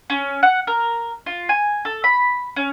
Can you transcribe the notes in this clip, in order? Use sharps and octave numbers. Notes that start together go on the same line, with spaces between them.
C#4
F#5
A#4
F4
G#5
A4
B5
C#4